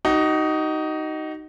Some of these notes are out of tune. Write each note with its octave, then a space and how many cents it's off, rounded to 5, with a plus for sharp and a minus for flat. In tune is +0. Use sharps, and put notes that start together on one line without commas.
D#4 +0 F#4 +40